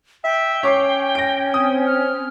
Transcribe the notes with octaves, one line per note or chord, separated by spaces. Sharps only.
E5 G5
C#4 C#5 D6 C7
A#6 D7
C4 D#6
F6